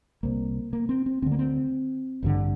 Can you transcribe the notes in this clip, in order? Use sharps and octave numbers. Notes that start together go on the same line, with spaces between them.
C2 C3 A#3
A#3
C4
C4
D2 D3 C4
A#3
C4
A1 G2 D3